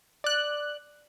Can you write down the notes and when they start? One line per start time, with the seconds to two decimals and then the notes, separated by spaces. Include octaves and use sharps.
0.24 D5 F#6